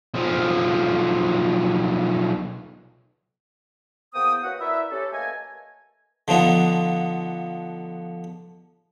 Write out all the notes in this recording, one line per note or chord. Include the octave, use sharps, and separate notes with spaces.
B1 F3
E2 A#3 B3 C5 G5 D#6
A#3 C#4 F#4 B4 D#5 F#5
E4 A#4 B4 D5 E5
C#4 G4 A4
A3 A#3 B4 D#5 G#5
D3 F3 B3 D#4